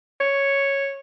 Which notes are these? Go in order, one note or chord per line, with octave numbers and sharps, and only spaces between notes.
C#5